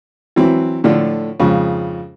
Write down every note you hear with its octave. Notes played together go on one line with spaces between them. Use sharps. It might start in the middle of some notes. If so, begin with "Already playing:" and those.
E3 F#3 C4 E4
A2 D3 F3 D4 F4 A4
F2 G#2 C#3